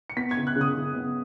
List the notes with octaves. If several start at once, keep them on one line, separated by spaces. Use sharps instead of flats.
C#7
B3 B6
G#6
C#3
F#6
C#3
D#6
C#3
B3